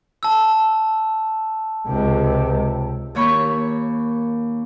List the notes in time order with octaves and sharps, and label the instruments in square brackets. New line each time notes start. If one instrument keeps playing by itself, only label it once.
[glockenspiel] A5 E6
[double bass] C#2 C3
[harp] D#2 A#3 C#5 B5 C#6